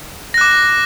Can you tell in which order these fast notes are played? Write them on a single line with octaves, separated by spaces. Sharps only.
A#6 F#6 D6